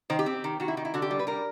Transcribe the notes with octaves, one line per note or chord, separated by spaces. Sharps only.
D#3 C5
G4
C4
D#3
D#3 F#4
E4
D#3 D#4
E4
D3 F#4
G4
G3
B4
G3 A#4